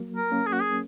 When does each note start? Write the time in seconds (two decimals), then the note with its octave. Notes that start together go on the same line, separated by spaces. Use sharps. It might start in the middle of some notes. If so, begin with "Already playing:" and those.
Already playing: F#3 A#3
0.16 A#4
0.32 A#3 C#4
0.47 G#4
0.53 F#4
0.61 G#4